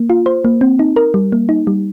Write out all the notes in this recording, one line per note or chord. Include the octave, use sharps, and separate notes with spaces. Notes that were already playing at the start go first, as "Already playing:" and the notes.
Already playing: A#3
F4
C5
A#3
C4
D#4
A#4
G3
A#3
D#4
G3